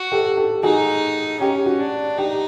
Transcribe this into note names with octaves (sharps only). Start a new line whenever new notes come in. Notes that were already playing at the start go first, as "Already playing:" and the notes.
Already playing: F#4
G4 A4
G4 A4
D#4 F#4 G#4
C#4 G4
F#4
D4
D#4 G4